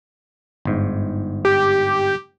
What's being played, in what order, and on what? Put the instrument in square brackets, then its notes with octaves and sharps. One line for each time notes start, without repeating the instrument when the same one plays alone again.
[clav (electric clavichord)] G1 G#2
[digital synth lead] G4